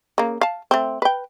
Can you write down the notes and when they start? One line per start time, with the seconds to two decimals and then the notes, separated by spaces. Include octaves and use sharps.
0.18 C#3 A#3
0.41 F5 A5
0.71 A3 C4
1.02 B4 G5